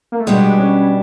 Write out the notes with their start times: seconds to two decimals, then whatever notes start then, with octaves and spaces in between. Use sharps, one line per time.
0.12 A#3
0.20 A3
0.27 B2 G3 G#3 B3 D4
0.59 C#4